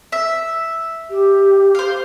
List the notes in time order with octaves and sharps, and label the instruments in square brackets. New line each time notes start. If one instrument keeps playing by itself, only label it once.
[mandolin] E5
[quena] G4
[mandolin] C5 F5